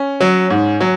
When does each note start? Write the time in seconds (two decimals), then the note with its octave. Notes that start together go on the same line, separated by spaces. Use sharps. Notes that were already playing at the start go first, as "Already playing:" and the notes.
Already playing: C#4
0.20 F#3
0.50 G#2
0.80 F#3